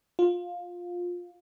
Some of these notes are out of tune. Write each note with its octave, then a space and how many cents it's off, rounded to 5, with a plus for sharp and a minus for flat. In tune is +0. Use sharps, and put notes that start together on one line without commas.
F4 +15